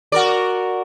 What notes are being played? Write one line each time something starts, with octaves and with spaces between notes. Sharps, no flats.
F#4 A#4 D5